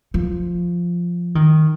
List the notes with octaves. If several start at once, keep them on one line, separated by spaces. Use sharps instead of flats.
F3
D#3